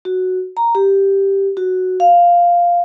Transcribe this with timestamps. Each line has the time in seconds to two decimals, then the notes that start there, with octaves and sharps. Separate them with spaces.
0.05 F#4
0.57 A#5
0.75 G4
1.57 F#4
2.00 F5